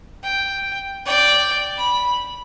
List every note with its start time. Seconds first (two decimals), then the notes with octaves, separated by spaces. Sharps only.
0.23 G5
1.06 D5 G5
1.77 B5